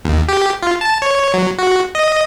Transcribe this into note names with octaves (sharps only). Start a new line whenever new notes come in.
D#2
G4
F4
A5
C#5
F#3
F#4
D#5